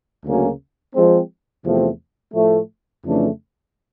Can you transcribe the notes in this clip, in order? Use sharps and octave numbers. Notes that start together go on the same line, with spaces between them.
D2 C#3 F#3 A#3 C#4
F3 G#3 C4
E2 C3 F3 A3 C4
A2 F3 A3
F2 C#3 E3 A3 D4